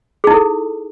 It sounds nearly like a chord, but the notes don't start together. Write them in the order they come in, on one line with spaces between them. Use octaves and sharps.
G#4 D#4 E4 A4